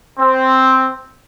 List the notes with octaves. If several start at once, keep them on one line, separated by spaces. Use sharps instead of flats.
C4